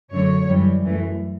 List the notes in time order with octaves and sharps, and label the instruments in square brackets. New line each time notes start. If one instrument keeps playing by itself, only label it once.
[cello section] F#2 D3 F#3 A3 C#5
F#2 E3 G3
F#2 E3 A3